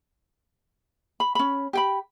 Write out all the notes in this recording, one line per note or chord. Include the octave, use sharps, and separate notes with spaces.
B5
C#4 B5
G4 G5 B5